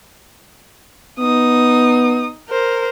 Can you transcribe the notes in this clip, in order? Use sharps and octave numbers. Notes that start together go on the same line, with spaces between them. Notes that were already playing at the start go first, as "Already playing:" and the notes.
B3 D#4 D#6
A#4 C5